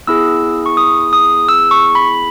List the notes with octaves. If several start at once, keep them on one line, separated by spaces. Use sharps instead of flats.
B3 E4 G#4 E6
C#6
D#6
D#6
E6
C#6
B5